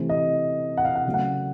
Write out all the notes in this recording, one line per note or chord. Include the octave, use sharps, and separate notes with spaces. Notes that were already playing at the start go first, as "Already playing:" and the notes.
Already playing: C3 E3 A3 C4
D#5
F#5
F5
F#5
C#3 F#3 A3 C#4
F#5